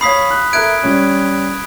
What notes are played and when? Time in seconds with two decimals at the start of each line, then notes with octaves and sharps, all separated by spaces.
0.01 C#5 F5 B5 D#6 B6 C7
0.31 F#6
0.53 A4 A#4 E5 F#6 G#6 D7
0.83 G3 C#4